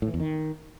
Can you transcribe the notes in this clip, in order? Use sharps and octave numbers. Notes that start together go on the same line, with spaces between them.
A2
E3
E2
D#3